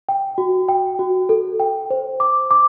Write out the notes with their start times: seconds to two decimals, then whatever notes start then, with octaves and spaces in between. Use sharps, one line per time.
0.09 G5
0.38 F#4
0.68 G5
0.99 F#4
1.29 A4
1.60 G5
1.90 C5
2.20 D6
2.51 D6